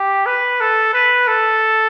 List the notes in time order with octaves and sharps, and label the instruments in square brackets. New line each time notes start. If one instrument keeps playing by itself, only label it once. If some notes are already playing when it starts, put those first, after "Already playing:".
Already playing: [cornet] G4
B4
A4
B4
A4